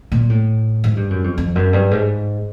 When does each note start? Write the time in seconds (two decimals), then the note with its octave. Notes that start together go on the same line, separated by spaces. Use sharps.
0.12 A#2
0.30 A2
0.84 G#2
0.96 G2
1.10 F#2
1.24 F2
1.38 F2
1.55 F#2
1.73 G2
1.91 G#2